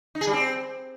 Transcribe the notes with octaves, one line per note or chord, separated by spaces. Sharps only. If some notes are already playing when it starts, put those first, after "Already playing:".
D#4
G#4
G3
C4